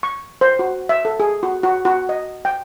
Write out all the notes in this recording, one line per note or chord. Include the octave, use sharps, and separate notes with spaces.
C#6
C5
F#4
E5
A4
G#4
F#4
F#4
F#4
D#5
G5